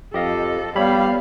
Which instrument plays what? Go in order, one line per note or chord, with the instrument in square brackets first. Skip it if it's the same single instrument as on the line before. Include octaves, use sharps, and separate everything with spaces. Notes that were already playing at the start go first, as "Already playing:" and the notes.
[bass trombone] F2 [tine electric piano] G4 D#5 F5 [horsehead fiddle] A4
[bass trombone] G3 [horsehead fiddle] B3 F5 [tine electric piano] C#5 B5